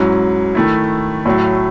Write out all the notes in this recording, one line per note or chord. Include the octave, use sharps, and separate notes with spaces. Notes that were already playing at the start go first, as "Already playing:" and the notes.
Already playing: G#2 F#3 C#4 E4
D#3 A3 E4
A2 F#3 A3